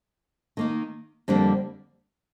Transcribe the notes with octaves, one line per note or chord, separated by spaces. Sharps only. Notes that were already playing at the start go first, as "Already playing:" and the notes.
D#3 A#3 D#4
F2 D3 G3 A#3 D4